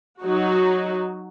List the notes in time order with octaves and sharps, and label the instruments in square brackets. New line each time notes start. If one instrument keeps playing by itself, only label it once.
[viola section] F#3 D#4 F#4